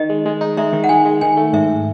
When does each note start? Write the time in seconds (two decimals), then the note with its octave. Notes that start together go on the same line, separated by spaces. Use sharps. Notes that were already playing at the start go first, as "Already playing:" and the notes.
Already playing: D#3 D#5
0.10 G#3
0.25 G#3
0.41 D#4
0.57 G#3 E5
0.73 D#3
0.84 F#5
0.89 G#3 G#5
1.05 G#3
1.21 D#3 G#5
1.37 A3
1.53 G#2 E5